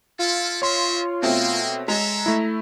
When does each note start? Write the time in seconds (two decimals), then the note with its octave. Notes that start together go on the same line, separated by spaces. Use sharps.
0.19 E4 F4 A4
0.62 C4 C#5 D#5 E5 C6
1.22 B2 A3 A#3 C4
1.88 G#3 A4 E5 A#5
2.26 A3 E4